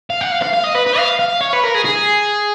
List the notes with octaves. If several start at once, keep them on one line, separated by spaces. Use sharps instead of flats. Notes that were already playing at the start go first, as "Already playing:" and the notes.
F5
F#5
F5
F5
F5
D#5
B4
B4
F5
F5
C#5
B4
A#4
G#4
G#4